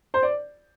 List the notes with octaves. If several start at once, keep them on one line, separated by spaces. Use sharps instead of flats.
C5
D5